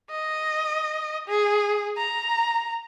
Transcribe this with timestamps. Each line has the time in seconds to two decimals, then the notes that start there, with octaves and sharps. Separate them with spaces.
0.11 D#5
1.28 G#4
1.97 A#5